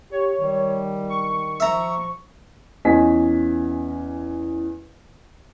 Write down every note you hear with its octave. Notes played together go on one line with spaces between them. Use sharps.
G4 C#5
D#3 G3
C#6
F3 E5 A#5
E2 C#4 D#5 G#5 B6